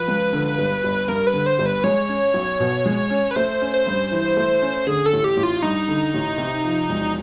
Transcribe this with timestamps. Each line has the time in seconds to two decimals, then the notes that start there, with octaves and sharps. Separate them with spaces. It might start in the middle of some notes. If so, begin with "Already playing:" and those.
Already playing: F3 B4
0.08 C#2
0.33 D3
0.58 G1
0.84 G1
1.08 G2 A#4
1.27 B4
1.33 D3
1.46 C5
1.59 G1
1.66 B4
1.84 G#3 C#5
2.09 C#4
2.34 B1
2.60 B2
2.86 G#3
3.10 C#4
3.31 B4
3.36 A3 C5
3.61 C#4
3.74 C5
3.87 G2
4.12 E3
4.37 A3
4.62 C#4
4.87 D3 G#4
5.06 A4
5.13 A1
5.24 G4
5.37 A1
5.43 F4
5.62 G2 D#4
5.88 D3
6.14 A1
6.38 C3
6.64 F3
6.89 E1